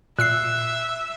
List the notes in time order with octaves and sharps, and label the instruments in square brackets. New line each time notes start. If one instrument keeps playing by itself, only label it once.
[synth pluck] A#2 E6 C7 [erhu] E5 [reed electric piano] F#6